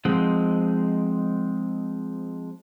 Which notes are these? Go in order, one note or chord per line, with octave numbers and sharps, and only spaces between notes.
F3 G#3 C4 D#4 F#5